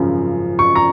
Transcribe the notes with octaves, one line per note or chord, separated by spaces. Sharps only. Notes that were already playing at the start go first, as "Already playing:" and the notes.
Already playing: G#1 F#2 C#3 F3
C#6
A#5